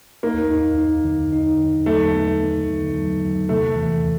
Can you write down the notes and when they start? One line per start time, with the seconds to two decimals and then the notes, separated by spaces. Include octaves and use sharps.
0.23 A#3 D#4
0.51 D#4
0.78 D#4
1.05 D3
1.32 D#4
1.59 D3
1.86 F#3 A3
2.14 B3
2.40 B3
2.68 D3
2.94 F#3
3.22 F#3
3.49 C3 A3
3.76 E3
4.03 E3